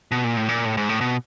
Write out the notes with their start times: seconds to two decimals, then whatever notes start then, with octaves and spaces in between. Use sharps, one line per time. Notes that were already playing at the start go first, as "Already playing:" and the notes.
0.11 B2
0.24 A#2
0.37 A2
0.49 A#2
0.65 A2
0.77 G#2
0.89 A2
1.01 B2